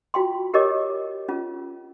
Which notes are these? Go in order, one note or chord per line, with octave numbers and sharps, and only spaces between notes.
F4 F#4 G5 C6
G4 A#4 C#5 D#5 D6
C#4 F4